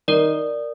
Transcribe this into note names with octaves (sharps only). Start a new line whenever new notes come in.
D#3 A#4 D5